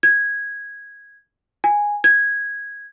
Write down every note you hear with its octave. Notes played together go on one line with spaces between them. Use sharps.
G#6
G#5
G#6